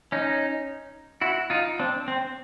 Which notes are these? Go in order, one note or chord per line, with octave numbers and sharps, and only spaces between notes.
C#4 D#4
E4 F#4
D#4 F4
C4 D4
C4